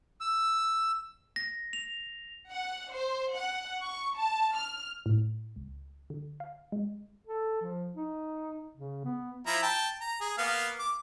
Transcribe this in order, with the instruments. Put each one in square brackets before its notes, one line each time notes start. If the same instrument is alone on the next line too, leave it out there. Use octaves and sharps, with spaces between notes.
[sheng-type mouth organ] E6
[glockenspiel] A#6
F7
[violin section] F#5
C5
F#5
C#6
A5
F6
[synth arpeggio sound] A2
C#2
D3
F5
G#3
[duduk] A4
F3
D#4
C#3
B3
[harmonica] F3 E4 A#5
G5 A5
A#5
G#4
A#3 B3 F5
D6